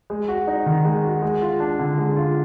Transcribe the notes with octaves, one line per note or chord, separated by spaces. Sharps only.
G#3
F#4
D#4
D#3
G#3
F#4
G#3
F4
D4
D3
G#3
F4